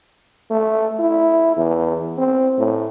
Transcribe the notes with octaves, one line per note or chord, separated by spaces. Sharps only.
A3
E4
E2
C4
A2